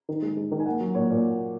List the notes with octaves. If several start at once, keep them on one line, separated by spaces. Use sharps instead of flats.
D#3
G#3
G#3
D#3
G#5
A#3 F#5
F#3
A#2 C#5
A#2